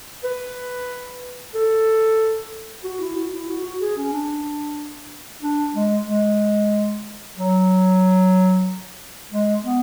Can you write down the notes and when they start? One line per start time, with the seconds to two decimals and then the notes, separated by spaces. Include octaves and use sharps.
0.24 B4
1.54 A4
2.84 F#4
3.00 E4
3.16 F#4
3.32 E4
3.49 F#4
3.64 F#4
3.81 G#4
3.97 C#4
4.13 D4
5.42 D4
5.75 G#3
6.07 G#3
7.37 F#3
9.32 G#3
9.64 B3